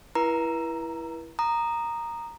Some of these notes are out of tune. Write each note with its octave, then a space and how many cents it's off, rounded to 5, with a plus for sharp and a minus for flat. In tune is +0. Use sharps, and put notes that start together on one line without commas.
E4 +10 B4 -40 A#5 +5
A#5 +0 D#6 -20